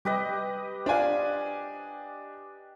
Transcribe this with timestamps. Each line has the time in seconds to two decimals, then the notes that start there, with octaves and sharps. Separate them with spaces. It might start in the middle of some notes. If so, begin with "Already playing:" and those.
0.05 G3 G4 B4 D#5
0.86 D4 C5 F5 G#5